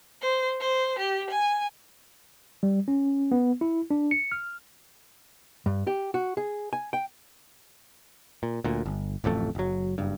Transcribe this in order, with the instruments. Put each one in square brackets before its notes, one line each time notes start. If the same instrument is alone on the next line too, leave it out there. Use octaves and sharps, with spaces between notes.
[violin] C5
C5
G4
G#5
[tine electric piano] G3
C#4
B3
E4
D4
C#7
F6
[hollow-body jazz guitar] G2
G4
F#4
G#4
G#5
G5
[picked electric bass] A#2
D2 A#2
G1
D1 A1 F2 A3
F#1 F#3
F#1 G2